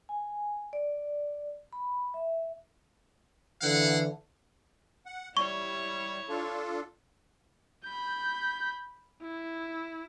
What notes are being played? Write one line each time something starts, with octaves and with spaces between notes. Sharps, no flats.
G#5
D5
B5
E5
D3 E3 E4 F5 F#5
F#5
G3 E4 C#5 C#6
D4 F4 A4
B5 G6
E4